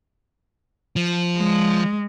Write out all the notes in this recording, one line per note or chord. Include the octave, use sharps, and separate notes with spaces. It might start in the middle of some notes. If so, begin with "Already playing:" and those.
F3
G#3